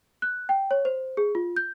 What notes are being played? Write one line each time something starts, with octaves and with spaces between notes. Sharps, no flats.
F#6
G5
C#5
C5
G#4
F4
G6